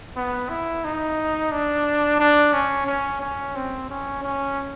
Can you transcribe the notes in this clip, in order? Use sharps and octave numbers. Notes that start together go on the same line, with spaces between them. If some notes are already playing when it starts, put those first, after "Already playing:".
B3
E4
D#4
D4
D4
C#4
C#4
C#4
C4
C#4
C#4